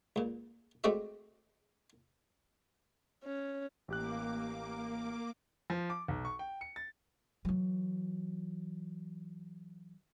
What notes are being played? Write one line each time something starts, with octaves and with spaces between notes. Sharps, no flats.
C#2 A#2
G#3 A3 C4 F#4 D5 E5
C#4
A1 A#3 G4 D6 F#6
F3
D6
B1
C#6
G5
C#7
A6
E3 F#3